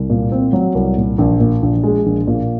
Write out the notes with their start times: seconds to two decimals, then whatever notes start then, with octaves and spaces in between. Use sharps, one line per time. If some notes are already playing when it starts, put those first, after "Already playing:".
Already playing: C2
0.10 A#2
0.32 C4
0.53 F#3
0.75 C2
0.97 A#2
1.18 A#1
1.40 A#2
1.62 A#1
1.84 G#3
2.06 A#1
2.27 A#2